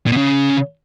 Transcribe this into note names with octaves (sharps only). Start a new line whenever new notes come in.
A#2
B2
C#3